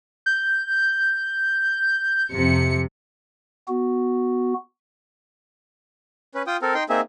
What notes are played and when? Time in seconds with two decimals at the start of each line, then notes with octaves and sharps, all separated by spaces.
0.26 G6
2.32 F2 C3 C#7
3.68 B3 F#4
6.35 C#4 B4
6.47 F4 G5 D#6
6.62 C4 A4 A#4
6.75 D#4 G5 C6
6.89 A#3 C4 D#4 G#4 E5